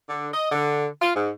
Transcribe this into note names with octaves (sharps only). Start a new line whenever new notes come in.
D3
D#5
D3
F4
G#2